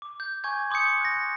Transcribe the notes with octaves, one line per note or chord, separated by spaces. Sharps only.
D6
G6
G#5 C#6 D6 G6 G#6
C6 D6 D#6 G6 C#7
F#6 A#6